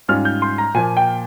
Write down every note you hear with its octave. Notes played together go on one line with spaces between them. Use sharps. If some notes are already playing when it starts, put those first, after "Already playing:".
G#2 G3 C#4 F4 F6
G6
C6
A#5
A#2 F3 A#3 G#5
G5